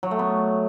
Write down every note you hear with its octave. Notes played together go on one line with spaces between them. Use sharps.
F#3
A3
B3